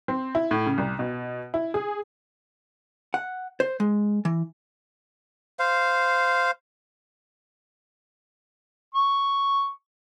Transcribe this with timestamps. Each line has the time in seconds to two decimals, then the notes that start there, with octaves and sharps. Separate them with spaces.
0.08 C4
0.35 E4
0.51 A2
0.66 C#3
0.78 C2
0.99 B2
1.54 E4
1.74 G#4
3.14 F#5
3.60 C5
3.80 G#3
4.25 E3
5.59 C5 F5
8.94 C#6